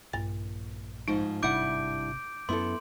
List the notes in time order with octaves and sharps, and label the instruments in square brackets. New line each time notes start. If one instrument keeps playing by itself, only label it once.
[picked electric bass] A#1 [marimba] G2 A6
[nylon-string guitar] G#2 F3 [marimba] D#4
[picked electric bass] G#1 C3 [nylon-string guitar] G2 E4 F#5 [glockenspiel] D6 G6 D7
[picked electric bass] F#2 [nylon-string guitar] B3 E4 A4 [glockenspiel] C6